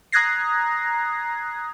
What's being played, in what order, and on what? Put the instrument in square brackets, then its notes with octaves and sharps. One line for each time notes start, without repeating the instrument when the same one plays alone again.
[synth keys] A#5 D#6 F#6 G#6 A#6 C7